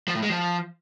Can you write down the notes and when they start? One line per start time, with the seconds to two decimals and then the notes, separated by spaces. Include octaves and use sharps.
0.08 F3
0.15 A2
0.22 G#3
0.30 F3